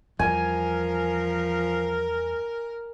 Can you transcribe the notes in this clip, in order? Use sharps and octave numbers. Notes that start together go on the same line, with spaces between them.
E2 F3 G3 A#4 G#5